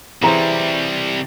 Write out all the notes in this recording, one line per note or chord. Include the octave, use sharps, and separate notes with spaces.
C3 E3 G3 C4 G#4 E5 A#5